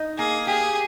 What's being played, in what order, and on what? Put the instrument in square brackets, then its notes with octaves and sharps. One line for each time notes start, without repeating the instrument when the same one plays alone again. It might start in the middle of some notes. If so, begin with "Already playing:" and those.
Already playing: [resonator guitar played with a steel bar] D#4
[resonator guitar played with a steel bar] A#3 [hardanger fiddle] G#4
[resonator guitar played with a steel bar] G4 [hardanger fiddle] G#4